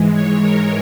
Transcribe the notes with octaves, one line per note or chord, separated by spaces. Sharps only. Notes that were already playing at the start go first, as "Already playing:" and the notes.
Already playing: G#2 E3 G#3
C#5
A#4